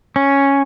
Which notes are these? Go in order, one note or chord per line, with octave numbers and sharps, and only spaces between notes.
C#4